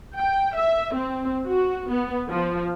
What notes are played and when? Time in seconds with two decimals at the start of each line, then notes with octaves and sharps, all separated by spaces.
0.17 G5
0.57 E5
0.95 C4
1.47 F#4
1.89 B3
2.29 F3